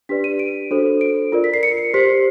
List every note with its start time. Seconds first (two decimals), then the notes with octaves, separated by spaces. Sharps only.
0.09 D4 G4 B4 D5 B6
0.24 D#7
0.39 D7
0.71 D4 F#4 A4 C5
1.01 D7
1.32 F4 A#4 D5
1.44 B6
1.54 C7
1.63 C#7
1.78 C7
1.94 G4 C5 B6